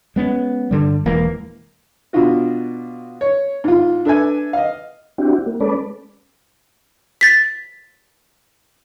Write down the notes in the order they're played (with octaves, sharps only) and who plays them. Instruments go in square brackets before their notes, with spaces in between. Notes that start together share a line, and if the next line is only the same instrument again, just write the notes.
[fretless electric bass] G#3 B3 C#4
G2 D3 G3
E1 E3 G#3 A#3
[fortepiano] B2 D4 F4 F#4
C#5
G#2 F4
D4 A4 B4 E5 G#5
D#5 F5
[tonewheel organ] C4 D4 E4 F#4 G4
A#3
G#3 C#4 A4 B4 D5
[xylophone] A6 B6